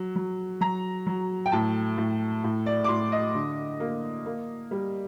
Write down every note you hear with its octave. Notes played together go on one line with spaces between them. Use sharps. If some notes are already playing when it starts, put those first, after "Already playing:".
Already playing: F#3
F#3
F#3 A#5
F#3
G5
A2 A5
A2
A2
D5
D6
A2 C6
D#5
D3
A#3
A#3
G3